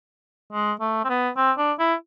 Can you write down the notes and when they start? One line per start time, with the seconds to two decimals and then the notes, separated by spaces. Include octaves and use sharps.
0.53 G#3
0.80 A3
1.04 C4
1.09 B3
1.37 C4
1.58 D4
1.79 E4